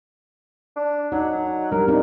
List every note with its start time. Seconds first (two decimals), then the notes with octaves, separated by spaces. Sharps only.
0.76 D4
1.12 F#3 D#4
1.72 G3 D4 A#4
1.88 A#2 C4 D#4